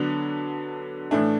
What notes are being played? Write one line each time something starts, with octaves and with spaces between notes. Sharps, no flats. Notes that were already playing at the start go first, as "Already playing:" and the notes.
Already playing: D3 F#3 B3 D4
A2 E3 A3 D4